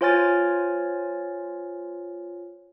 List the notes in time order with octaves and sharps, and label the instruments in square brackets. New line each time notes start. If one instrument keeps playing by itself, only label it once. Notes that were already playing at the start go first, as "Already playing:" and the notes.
[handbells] F4 C5 C#5 G#5 F6 A6